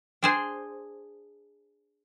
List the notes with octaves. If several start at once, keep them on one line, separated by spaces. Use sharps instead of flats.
D4 G#4 C5